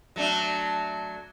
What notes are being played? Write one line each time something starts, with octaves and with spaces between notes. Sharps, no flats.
F#3 A3 D4